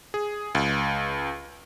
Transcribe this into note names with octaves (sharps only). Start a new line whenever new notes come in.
G#4
C#2